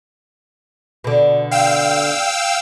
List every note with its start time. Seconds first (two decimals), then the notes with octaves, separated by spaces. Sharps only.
1.04 B2 D3
1.51 F5 G5 E6